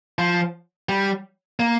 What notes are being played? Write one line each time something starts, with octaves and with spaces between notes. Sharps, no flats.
F3
G3
A#3